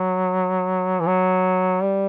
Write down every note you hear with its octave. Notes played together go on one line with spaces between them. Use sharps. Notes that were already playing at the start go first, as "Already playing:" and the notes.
Already playing: F#3
E3
F#3
G3